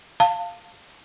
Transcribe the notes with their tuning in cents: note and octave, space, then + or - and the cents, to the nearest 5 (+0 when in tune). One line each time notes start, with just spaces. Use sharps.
F5 +0 A5 +30